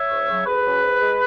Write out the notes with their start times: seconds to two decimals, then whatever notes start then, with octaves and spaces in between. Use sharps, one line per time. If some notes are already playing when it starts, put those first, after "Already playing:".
Already playing: C#5 E5
0.10 D2
0.29 C#3 F#3
0.46 D2 G#4 B4
0.65 C#3 F#3
0.82 G#2
1.00 G#3